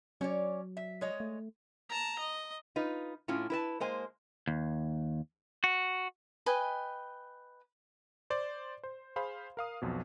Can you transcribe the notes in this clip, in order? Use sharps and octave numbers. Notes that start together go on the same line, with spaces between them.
F#3 C#4 C#5 D5
E5
G#3 C#5 D#5
A3
A5 A#5
D#5
D#4 F4 B4
A2 C#4 E4 F4
E4 B4 A5
G#3 A#3 C5 G#5
D#2
F#4
B4 D#5 G5 G#5
C5 D5
C5
G#4 C5 F5 B5
A#4 F5 D#6
B1 F2 B2